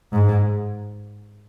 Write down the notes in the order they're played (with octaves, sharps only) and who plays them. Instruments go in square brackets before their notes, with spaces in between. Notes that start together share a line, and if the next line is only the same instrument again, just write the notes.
[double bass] G#2